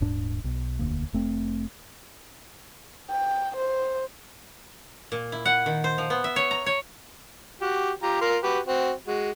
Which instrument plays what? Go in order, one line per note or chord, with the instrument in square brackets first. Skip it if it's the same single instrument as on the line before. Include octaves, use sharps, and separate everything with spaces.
[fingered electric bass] D#1 G#2 D4
B1 B2
E1 D2 A#3
F1 A3 C4
[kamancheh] G5
C5
[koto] A#2
E4
F#5
D#3
C5
F3
B3
E5
C#5
A#5
C#5
[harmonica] F#4 G4
F4 G4 A#5
F4 A#4 C6
F#4 G4 B4
C4 F#4
G#3 F#4